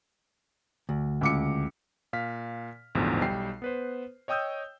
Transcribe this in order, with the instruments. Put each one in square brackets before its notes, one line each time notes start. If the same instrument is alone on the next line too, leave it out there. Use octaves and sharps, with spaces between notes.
[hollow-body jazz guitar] D2
[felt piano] C#2 D6 C#7
[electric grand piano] A#2 F5 F6 B6
A1 E2 G#2 B2 D3 F3
B1 G3 G5 C7
B3 B4 C5
C#5 D#5 G5 D#6 E6 G6